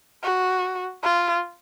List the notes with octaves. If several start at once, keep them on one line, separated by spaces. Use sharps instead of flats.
F#4
F4